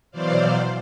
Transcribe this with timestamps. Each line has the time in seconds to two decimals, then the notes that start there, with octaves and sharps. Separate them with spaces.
0.11 B2 E3 F#3 C5 D5 F5